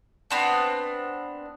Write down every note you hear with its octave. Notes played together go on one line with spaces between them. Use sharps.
B3 C4 D4